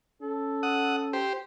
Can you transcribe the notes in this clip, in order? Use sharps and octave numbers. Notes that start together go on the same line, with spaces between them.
C#4 A4
F#5 D#6
G4 C5